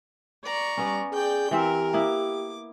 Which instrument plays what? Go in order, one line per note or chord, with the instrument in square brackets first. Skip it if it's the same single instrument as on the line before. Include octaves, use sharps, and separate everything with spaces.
[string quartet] D5 A#5 C#6
[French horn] G3 [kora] B3 C#4
[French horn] G#4 [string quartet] D5 G5 G6
[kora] E3 C4 E5 [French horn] G4 [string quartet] A#4
[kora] A#3 B3 E4 [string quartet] D6